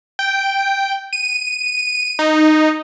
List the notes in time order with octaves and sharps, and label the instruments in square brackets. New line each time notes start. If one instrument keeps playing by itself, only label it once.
[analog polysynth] G5
D#7
D#4